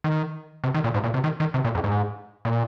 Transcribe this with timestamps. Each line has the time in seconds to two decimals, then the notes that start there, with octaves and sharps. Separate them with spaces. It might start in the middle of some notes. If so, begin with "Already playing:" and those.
0.04 D#3
0.64 C3
0.74 D#3
0.84 A#2
0.94 G#2
1.04 A#2
1.14 C3
1.24 D#3
1.40 D#3
1.54 C3
1.65 A#2
1.75 F2
1.84 G#2
2.45 A#2